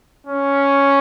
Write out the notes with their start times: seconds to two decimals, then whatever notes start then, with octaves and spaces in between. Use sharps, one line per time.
0.27 C#4